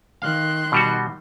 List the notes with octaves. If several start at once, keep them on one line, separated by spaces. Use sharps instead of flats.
D#3 F5 C6 F#6
B2 G3 F#4